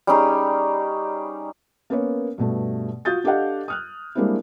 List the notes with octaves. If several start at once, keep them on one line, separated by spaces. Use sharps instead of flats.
G3 C#4 D#4 G#4
A#3 B3 C#4 A#4 C#5
G2 B2 A3
F4 F#4 D#6 G6 A6
D4 G4 A4 D#5 F5 F#5
D#6 F6 F#6
G3 G#3 A#3 C4 D4 E4